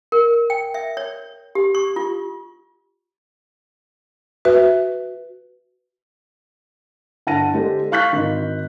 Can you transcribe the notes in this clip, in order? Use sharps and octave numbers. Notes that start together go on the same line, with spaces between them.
A#4
G5
E5
C#5
G4
C#6
F4
F#4 B4 E5
G1 F#5 A5 A#6 D#7
D3 G#3 D4 G4 A4 C5
F5 C#6 F#6 G6 B6
G#1 D#4